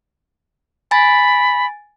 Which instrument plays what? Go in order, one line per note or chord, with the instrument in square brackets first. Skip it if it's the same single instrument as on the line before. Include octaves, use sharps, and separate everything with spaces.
[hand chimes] G#5 A6 [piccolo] B5